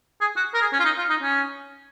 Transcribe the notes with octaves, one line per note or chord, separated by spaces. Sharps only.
G#4
F#4
A#4
G#4
C#4
F4
D#4
F4
D#4
C#4